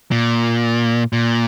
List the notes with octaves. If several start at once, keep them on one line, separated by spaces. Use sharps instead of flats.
A#2
A#2